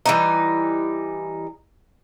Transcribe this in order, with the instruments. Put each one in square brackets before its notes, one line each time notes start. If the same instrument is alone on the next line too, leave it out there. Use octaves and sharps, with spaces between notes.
[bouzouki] E3 G3 D#4